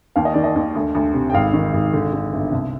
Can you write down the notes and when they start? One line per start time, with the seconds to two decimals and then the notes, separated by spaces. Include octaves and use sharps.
0.16 D#2 F5
0.25 D#5
0.34 D#3 D5
0.44 D#5
0.56 D#2
0.75 D2
0.95 D2
1.14 C3
1.30 G5
1.34 G#1 F5
1.53 D#3
1.74 G#1
1.93 D3
2.13 D3
2.33 G1
2.52 C2